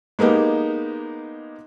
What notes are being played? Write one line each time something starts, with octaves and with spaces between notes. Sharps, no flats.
G#3 A#3 B3 D#4 G4